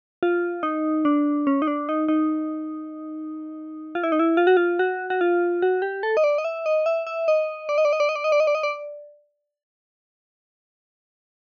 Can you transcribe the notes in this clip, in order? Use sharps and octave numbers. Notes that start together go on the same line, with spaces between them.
F4
D#4
D4
C#4
D#4
D4
D#4
D#4
F4
E4
D#4
E4
F4
F#4
F4
F#4
F#4
F4
F#4
G4
A4
D#5
D5
D#5
E5
D#5
E5
E5
D#5
D5
D#5
D5
D#5
D5
D#5
D5
D#5
D5
D#5
D5
D#5
D5